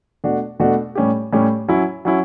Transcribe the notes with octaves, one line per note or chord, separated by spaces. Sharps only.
B2 A3 D4 F#4
B2 A3 D4 F#4
A2 G3 C#4 G4
A2 G3 C#4 G4
F#3 C#4 E4
F#3 C#4 E4